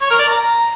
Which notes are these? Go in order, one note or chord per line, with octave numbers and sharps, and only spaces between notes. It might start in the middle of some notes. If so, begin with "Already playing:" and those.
C#5
A#4
D5
A#5